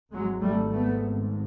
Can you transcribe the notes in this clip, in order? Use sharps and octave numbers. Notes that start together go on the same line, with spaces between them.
G#1 G#2 F#3 G#3
G3 A3
A3 B3